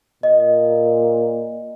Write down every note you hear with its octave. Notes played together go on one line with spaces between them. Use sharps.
A#2 D#5